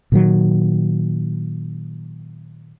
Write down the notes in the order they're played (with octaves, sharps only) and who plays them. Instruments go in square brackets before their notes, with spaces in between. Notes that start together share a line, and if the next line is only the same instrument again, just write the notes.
[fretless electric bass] A#2 D#3 F#3